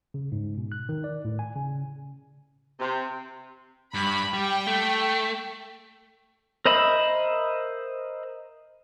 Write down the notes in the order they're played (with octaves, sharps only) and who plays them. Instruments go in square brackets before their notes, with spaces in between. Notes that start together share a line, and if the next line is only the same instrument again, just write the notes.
[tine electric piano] C#3
G#2
B2
F#6
D#3
D5
A2
G#5
C#3
[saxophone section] C3
[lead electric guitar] G2 [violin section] B5
[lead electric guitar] G3 [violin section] G5
[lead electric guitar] A3
[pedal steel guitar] A#4 C5 D#5 E5 B5